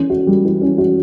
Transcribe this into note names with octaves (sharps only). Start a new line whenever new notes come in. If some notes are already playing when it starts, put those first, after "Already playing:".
Already playing: E3 C#4
F#4
G3
E3
C#4
F#4